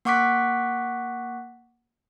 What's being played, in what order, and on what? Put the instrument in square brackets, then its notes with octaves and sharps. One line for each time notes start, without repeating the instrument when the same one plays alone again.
[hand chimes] A#3 F#5 C#6 D6 F#6 B6